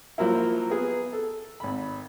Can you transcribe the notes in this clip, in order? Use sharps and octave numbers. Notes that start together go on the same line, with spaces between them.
F3 F#3 A#3 E4
B3 G#4
A4
G#1 B5